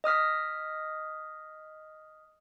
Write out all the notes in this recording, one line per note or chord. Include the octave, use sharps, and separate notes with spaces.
D#5 D#6 F6 B6